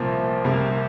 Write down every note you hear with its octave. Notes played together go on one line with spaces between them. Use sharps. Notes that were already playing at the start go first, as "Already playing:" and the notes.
Already playing: C2 A#2 F3 A#3
C2 C3 A#3